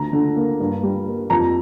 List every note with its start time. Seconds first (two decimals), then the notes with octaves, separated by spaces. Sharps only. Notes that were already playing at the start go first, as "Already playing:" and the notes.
Already playing: D2 A#5
0.13 D3
0.36 A#3
0.60 G2
0.83 G3
1.07 A#3
1.30 F2 A#5